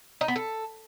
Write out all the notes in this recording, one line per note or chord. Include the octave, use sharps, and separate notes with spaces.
D#4
B3
A4